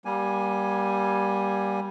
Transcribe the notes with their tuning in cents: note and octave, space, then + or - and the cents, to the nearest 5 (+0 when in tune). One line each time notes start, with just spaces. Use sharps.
G3 +0 A#3 +35 G#5 +0